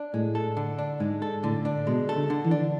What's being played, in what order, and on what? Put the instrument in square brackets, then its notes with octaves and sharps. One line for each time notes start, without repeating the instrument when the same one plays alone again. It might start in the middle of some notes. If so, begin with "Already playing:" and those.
Already playing: [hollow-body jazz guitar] D4
[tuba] A2 [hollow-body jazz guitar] G#3
[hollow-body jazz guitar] A4
D3
D4
[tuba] G#2 [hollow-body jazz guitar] G#3
[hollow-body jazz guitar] A4
[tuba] A2 [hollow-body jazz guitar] D3
[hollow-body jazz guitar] D4
[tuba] B2 [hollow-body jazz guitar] G#3
[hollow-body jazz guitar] A4
[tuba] D3
[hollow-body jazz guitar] D3
[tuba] E3
[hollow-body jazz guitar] D4